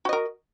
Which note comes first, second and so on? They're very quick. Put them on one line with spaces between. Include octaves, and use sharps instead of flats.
F#4 D#5 A#4